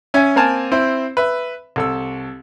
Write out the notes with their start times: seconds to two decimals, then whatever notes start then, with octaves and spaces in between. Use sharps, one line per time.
0.14 C#4 E5 G#5
0.36 A#3 C4 A#4 G#5 A5
0.72 C4 E4 C5
1.17 B4 E5
1.76 C2 A4 E6